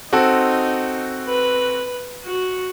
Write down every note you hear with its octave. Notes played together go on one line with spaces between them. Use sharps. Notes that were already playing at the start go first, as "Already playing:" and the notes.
C4 D#4 F#4 A4
B4
F#4